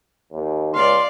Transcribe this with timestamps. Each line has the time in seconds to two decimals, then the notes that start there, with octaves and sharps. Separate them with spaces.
0.32 D#2
0.74 C#2 D5 F5 C6